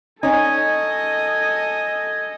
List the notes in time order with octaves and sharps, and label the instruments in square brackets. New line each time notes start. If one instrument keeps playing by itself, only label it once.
[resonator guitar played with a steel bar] C#4 D#4 [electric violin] A4 D#5 [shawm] G#5